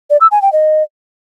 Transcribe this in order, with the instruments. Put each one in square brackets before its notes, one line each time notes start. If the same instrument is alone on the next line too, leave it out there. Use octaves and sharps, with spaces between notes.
[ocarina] D5
E6
G#5
G5
D#5